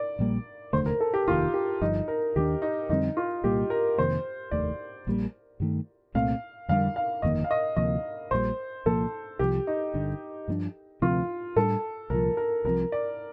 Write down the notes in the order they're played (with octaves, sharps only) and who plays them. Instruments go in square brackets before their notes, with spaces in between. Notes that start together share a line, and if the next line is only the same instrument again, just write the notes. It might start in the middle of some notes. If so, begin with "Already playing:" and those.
Already playing: [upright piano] D5
[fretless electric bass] A#1 A#2 G3 A#3
[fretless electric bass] F1 D#2 D3 A3 [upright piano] C5
[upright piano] A#4
A4
G4
[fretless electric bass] F1 D#2 D#3 [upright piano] F4
[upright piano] G4
[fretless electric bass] G1 G2 F3 [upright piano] D#4
[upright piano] A#4
[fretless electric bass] D#2 D#3 G3 D4 [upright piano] G4
[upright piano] D#4
[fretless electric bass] F2 D3 G3 C4 [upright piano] D#4
[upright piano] F4
[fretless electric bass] C2 A#2 G3 A#3 [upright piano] G4
[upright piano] A#4
[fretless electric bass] F2 C3 D#3 A#3 [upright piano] C5
[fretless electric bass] F1 D#2 D#3 A3 [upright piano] D5
[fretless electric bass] A#1 A#2 G3 A#3
G2 D#3 A3
[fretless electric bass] C2 A#2 A3 C4 [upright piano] F5
[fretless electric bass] F2 D3 G3 D4 [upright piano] F5
[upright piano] F5
[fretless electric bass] G1 F2 D#3 A#3 [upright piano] D#5
[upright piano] F5
D#5
[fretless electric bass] D2 C3 F3 A#3 [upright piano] D#5
[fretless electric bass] A#1 A#2 G3 [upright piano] C5
[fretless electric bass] C2 A#2 F3 A#3 [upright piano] A4
[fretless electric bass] C2 C3 F3 [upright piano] G4
[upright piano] D#4
[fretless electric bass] G1 G2 D3
G2 F3 A#3 D4
[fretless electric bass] D2 C3 F3 C4 [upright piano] F4
[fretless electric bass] A2 G3 D4 [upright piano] A4
[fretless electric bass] C2 A#2 F3 [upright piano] A#4
[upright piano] A#4
[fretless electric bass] C2 C3 F3 [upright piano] A#4
[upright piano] D5